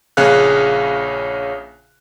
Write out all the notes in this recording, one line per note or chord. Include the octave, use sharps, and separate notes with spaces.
A#1 C#3 G#4 C#5 F5 F#6